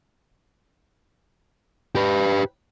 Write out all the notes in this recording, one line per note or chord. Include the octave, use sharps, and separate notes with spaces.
G4 B4